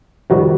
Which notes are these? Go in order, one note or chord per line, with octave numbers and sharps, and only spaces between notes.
F2 C3 D#3 G3 F#4